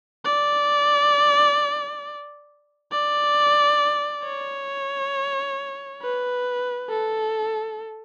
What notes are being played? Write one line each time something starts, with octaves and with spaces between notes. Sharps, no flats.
D5
D5
C#5
B4
A4